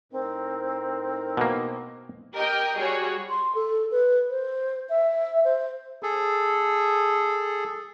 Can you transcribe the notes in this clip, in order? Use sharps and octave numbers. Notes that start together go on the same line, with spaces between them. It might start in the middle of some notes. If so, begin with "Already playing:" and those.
A2 C4 D#4 A#4
B2 A#3
G4 A#4 D#5 G5
G3 F#4 G#4 C#5
C6
A4
B4
C5
E5
C5
G#4 A4